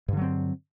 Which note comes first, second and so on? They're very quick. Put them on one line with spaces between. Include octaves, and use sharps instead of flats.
G2 D3 F#3 C4